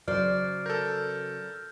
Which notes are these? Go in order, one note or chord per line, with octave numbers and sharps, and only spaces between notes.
C#3 F#3 C5 D5 F6
A4 A#4 G6